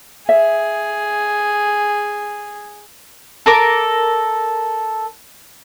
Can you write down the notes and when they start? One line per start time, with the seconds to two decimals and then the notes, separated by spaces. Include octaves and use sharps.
0.29 G#4 E5
3.46 A4 A#4 D6